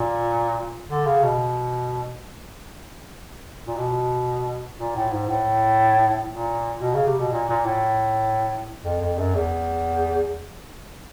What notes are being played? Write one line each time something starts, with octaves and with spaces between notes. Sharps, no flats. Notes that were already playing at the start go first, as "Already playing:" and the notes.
Already playing: A#2
D3
C#3
B2
A#2
B2
A#2
A2
G#2
A2
A#2
B2
C#3
C3
B2
A#2
A#2
A2
F2
F2
F#2
E2